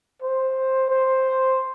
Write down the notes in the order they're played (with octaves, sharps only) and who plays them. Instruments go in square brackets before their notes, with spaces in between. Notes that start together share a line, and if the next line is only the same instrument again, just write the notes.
[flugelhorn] C5
C5